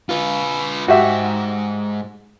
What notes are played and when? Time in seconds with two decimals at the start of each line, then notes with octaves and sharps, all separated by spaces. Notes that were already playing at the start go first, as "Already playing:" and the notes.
0.09 F4 B4
0.88 G#2 F#4 G4 E5